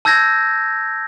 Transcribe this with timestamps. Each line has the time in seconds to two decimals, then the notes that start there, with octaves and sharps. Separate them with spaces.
0.05 A5 E6 G6 G#6 A#6